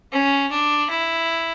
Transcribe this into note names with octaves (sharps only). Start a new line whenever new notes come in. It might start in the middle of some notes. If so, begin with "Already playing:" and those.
C#4
D4
E4